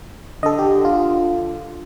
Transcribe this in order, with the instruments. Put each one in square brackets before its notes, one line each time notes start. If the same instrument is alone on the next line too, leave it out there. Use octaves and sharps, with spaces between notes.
[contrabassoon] D3 [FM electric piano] A4 D#5
[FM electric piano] G4
F4